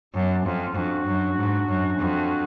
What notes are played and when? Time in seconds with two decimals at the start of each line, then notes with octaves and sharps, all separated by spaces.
0.14 F#2 B3 D4
0.44 F2 C#4 F4
0.75 F2 D4 F#4
1.06 F#2
1.37 G#2
1.68 F#2
1.99 F2